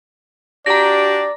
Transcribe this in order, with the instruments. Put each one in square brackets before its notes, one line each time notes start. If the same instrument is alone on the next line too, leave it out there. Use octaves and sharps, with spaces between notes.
[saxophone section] D4 F#4 G4 [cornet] D5 [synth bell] A#5 A#6